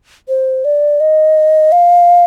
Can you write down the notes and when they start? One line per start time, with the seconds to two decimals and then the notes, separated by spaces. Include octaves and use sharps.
0.28 C5
0.65 D5
1.00 D#5
1.72 F5